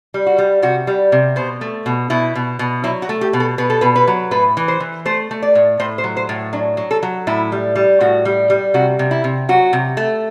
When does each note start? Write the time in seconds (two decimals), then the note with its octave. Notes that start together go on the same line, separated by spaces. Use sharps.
0.14 G3
0.27 F#4
0.38 G3
0.62 C3 F#4
0.87 G3
1.12 C3
1.36 B2 C5
1.61 A3
1.86 B2
2.10 B2 E4
2.35 B2
2.59 B2
2.84 F#3 E4
3.02 F#4
3.09 A3
3.21 G4
3.33 B2
3.40 A4
3.58 B2 B4
3.70 A4
3.81 B2 B4
3.96 B4
4.07 F#3
4.31 A2 B4
4.57 E3
4.68 C5
4.80 E3
5.06 A3 C5
5.31 A3
5.42 D5
5.55 A2
5.80 A2 C5
5.98 C5
6.04 F#3
6.17 C5
6.29 A2
6.53 F#3 D4
6.77 F#3
6.91 A4
7.03 F#3
7.27 A2 E4
7.52 G3
7.76 G3
8.01 A2 F#4
8.25 G3
8.50 G3
8.74 C3 F#4
8.99 C3
9.11 E4
9.24 C3
9.49 F#3 F#4
9.73 C3
9.97 A3